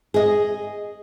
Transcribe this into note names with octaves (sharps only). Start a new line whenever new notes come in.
G#4 D#5